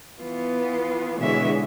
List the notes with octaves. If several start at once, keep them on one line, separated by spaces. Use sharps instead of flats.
E3 B3 F4
B2 D3 E3 G#3 C#5 E5